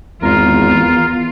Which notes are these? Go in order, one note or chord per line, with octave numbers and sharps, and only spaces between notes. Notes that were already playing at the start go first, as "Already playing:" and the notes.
G#1 E2 F4 A#4